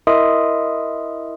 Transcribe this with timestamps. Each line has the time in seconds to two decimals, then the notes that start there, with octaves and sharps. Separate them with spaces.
0.07 E4 A#4 D#5 E5 C6 D#6